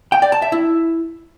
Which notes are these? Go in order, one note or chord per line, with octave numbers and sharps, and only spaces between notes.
G5
D5
A5
E5
E4